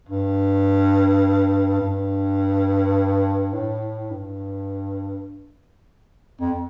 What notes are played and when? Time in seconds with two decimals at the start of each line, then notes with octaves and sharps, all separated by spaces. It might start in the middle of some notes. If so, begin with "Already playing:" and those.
0.09 G2
1.81 G2
3.53 A2
4.11 G2
6.41 F2